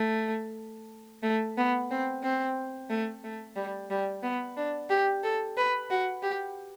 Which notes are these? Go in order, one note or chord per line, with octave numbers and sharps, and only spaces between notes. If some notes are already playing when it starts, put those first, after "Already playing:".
Already playing: A3
A3
B3
C4
C4
A3
A3
G3
G3
B3
D4
G4
A4
B4
F#4
G4